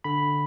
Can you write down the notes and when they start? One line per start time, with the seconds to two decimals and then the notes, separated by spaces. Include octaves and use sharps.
0.04 D3 B5